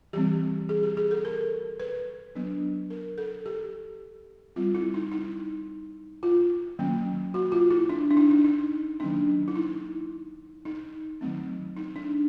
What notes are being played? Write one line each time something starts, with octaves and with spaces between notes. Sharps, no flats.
E3 G3 C4 G4
G#4
G4
G#4
A4
A#4
B4
F#3 B3 D4
A#4
A4
G4
G3 C4 F4
E4
D#4
D#4
F4
D#3 F#3 A#3 C#4
F#4
F4
E4
D4
D4
D#4
D#4
D#4
D#3 F#3 A#3 C#4 D4
E4
D#4
D#4
D#3 F#3 A3 C4
D#4
D4